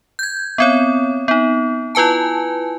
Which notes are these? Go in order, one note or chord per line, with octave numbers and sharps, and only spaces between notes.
G6 G#6
B3 C4 C#5
B3 D#4
E4 F4 B4 G#5 A5